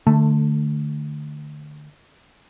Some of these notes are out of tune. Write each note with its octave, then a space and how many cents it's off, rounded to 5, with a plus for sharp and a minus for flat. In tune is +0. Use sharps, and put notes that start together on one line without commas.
D3 +25 A3 +0